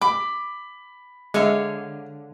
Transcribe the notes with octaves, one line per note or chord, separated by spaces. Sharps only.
B5 D6
D3 G#3 C#5 E5 F5